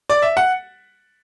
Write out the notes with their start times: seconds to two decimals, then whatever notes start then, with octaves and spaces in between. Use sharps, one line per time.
0.10 D5
0.22 E5
0.37 F#5